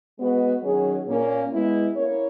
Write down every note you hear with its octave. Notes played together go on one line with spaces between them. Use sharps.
G#3 B3 F#4 B4 D#5
D#3 F#3 C#4 G#4
A#2 A#3 C#4
G#3 B3 E4
A#3 C#4 E4 A#4 C#5